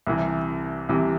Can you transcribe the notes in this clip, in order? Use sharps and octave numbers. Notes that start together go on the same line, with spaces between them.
C2 C3 E3
C2 C3 E3